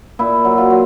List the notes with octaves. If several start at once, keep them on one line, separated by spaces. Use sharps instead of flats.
A#2 E4
F#3
F4
F#3